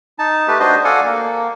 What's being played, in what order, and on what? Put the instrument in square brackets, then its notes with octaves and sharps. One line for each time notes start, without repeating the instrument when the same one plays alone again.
[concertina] D#4 A5
A3 G4 B4
D4 F#4 C5 D#5
A4 D5 F5 F#5 G#5
A#3